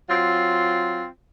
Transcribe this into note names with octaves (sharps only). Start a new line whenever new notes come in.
F#3 C4 F4